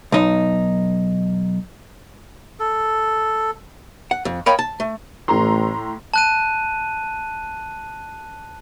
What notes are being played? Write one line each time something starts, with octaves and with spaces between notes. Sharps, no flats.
B1 D#4
A4
F#5
F2
A#4 C#5 D#5 F5 G5 B5
A5
A3
A1 A2 A#5 C6
A5 F#6 D#7